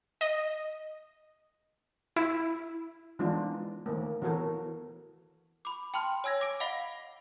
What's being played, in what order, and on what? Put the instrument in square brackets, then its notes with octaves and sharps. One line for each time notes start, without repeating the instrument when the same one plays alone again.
[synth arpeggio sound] D#5
E4
[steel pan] E3 G#3 B3 D4 D#4 F4
D#3 A3 A#3
E3 B3 F#4 A4 A#4
[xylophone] B5 D6
G5 A5 B5 C6 F6
C#5 G#5 E6 G#6 A#6
D6 D7
D#5 F5 F#5 B5 A#6 G7